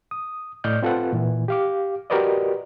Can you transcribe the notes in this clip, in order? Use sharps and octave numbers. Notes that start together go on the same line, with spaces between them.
D#6
A2 D5 D#5 F6 G6
C4 F4 A4 B4 F#5
A#2 E3
G4 F5 D6
F#4 G4 A#4 B4 D5 D#5